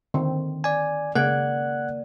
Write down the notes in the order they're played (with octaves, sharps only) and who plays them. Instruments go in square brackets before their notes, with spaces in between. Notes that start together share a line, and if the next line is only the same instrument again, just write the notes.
[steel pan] D3 D#3 C4
[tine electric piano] D5 G#5
[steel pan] C#3 [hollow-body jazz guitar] A#3 D5 [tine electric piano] F#5 F#6 G#6